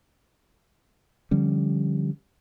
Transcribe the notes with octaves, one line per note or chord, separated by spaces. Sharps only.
D3 F3 G3 C#4